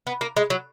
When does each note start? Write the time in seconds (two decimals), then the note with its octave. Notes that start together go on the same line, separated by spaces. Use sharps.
0.07 B3
0.21 A#3
0.37 G#3
0.50 F#3